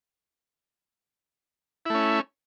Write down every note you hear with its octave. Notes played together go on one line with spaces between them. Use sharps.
A3 C#4 E4